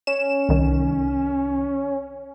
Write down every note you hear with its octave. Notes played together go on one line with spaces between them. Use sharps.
C#4 E7
C2 D#3